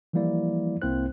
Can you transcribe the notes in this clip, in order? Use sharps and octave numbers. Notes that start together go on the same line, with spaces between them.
E3 F3 G3 A#3 E4 D5
C2 A#3 C4 E4 C5 F#6